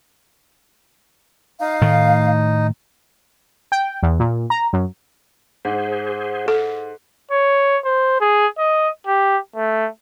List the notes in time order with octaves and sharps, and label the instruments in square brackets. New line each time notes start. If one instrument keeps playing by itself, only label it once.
[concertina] D#4 [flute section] F5
[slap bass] A2 D#3 A3
[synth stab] G5
E2
A#2
A#5
F#2
[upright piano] G#2 [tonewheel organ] G#4 C5
[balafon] A4
[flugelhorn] C#5
C5
G#4
D#5
G4
A3